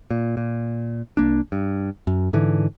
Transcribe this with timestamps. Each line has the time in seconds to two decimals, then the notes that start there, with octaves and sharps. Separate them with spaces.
0.10 A#2
0.37 A#2
1.17 C2 A#3 D4
1.52 G2
2.07 F#2
2.33 G#2 D3 E3